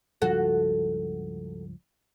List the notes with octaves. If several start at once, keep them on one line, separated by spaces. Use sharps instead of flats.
C#2 G2 F3 F#4 A4